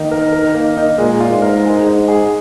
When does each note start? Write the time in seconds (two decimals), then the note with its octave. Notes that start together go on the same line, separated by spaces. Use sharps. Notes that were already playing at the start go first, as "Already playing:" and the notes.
Already playing: D#3 A#3 D#4
0.11 A#4
0.32 A#4
0.54 A#3
0.77 D#4
0.98 A#2 G#3
1.20 F4
1.32 G#2
1.42 A#4
1.65 G#3
1.87 D#4
2.08 G#4